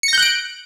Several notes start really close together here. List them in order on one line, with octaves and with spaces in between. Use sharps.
C#7 A#6 G6 F#6 D7